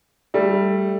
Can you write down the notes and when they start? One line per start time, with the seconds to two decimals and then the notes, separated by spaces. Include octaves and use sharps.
0.34 G3 A3